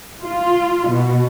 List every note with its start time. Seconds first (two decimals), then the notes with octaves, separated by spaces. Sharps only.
0.23 F4
0.88 B2